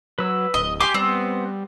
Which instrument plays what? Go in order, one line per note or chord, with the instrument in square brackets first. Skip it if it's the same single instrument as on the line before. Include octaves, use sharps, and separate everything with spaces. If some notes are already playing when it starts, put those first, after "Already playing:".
[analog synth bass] F#3 [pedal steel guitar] B4 E6
[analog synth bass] D1 [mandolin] D#5
[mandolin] G4 G#5 C6 [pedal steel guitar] D6
[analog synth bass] G3 [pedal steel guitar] B3 [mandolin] C4